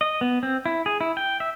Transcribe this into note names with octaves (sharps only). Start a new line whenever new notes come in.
D#5
B3
C4
E4
G#4
E4
G5
E5